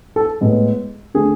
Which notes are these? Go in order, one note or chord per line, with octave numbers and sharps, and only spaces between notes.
A4
A2 G#3 B3
D3 A3 G#4